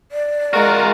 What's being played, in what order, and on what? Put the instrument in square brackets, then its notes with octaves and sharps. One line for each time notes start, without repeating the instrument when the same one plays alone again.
[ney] D5
[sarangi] G#3 [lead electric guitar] F4 F#4 [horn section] A#4